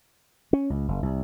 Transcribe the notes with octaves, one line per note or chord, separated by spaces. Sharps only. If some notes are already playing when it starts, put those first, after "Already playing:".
C#4
C#2
F#1
C2